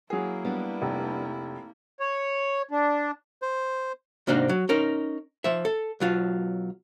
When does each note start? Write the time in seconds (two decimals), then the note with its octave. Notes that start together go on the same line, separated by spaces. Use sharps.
0.10 F#3 A#3 E4 G#4
0.45 G3 B3 D4
0.82 F1
2.00 C#5
2.71 D4
3.42 C5
4.27 G#2 C3 A#3 D4 D#4 F#4
4.49 F#3
4.69 C#4 D#4 A#4
5.44 F3 E5
5.65 A4
6.00 B1 F#3 F4